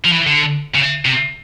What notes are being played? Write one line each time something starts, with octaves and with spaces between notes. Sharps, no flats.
F3
E3
D3
C#3
C3